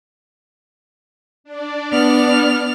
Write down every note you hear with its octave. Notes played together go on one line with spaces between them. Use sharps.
D4 D5
B3 F6